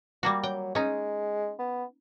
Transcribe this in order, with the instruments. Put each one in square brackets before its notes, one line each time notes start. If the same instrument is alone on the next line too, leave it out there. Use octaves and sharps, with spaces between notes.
[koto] G3 A#3 F#4
[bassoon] F#3 [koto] G5
[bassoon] G#3 [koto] C#4 D#4
[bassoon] B3